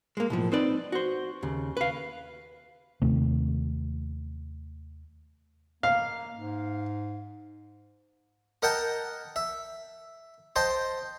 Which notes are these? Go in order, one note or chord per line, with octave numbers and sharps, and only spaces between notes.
G#3 A#3
B1 A2 F3
C4 D#4 B4 D5
F#4 C5
D#2 C#3
B4 F5
D#2 C3 D#3 A3
A#3 F5
G#2
A#4 D#5 F#5 G5 A5
E5
C5 D#5 G5 A5